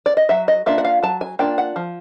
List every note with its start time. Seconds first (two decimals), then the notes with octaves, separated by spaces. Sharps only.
0.06 D5
0.17 D#5
0.29 F#3 E5
0.48 D#5
0.66 A#3 D4 F4 E5
0.78 F#5
0.85 F5
1.03 F#3 A5
1.21 G#5
1.39 A#3 D4 F4 G5
1.58 F#5
1.76 F3